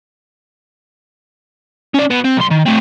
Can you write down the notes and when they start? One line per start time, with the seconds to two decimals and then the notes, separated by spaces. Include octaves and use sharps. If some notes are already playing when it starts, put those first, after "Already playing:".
1.94 C#4 D5
2.11 B3 F#4
2.25 C4
2.37 B1 C6
2.51 D#3
2.66 A3 C4